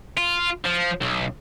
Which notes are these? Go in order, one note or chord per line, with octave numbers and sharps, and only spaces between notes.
F4
F3
B1